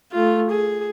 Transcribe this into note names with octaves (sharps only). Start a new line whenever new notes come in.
A3 F4
G#4